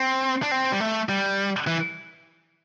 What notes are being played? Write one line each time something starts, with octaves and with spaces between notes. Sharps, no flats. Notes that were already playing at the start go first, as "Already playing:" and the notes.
Already playing: C4
D4
C4
G3
A3
G3
E3